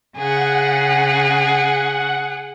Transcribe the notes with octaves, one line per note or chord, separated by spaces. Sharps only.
C#3 G#4 F#5